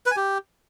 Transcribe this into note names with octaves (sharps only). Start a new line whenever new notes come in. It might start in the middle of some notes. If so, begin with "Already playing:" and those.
B4
G#5
G4